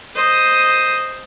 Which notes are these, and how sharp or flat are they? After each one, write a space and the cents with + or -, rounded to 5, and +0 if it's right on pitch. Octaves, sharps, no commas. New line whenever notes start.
C5 +0 D#5 +0